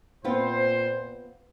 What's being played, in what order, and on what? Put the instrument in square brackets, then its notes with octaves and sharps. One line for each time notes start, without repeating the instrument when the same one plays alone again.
[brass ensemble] A#2 C5 [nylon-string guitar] B3 C4 F4